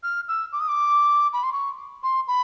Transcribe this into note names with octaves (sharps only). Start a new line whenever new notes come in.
F6
E6
D6
D#6
D6
B5
C6
C#6
C6
B5